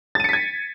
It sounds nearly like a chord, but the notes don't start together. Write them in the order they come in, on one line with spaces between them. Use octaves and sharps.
A6 D#7 C#7 B6 G#6